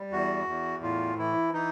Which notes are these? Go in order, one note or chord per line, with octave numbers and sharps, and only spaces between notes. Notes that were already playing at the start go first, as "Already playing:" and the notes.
Already playing: G3
E2 F#4
E2
A2 F4
E3 E4
E3 D#4